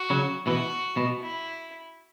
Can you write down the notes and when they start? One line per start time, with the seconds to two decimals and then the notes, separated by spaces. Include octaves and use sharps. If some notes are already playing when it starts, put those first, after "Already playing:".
Already playing: F#4
0.10 C#3 F#3
0.47 B2 E3 F#4
0.97 B2
1.21 E4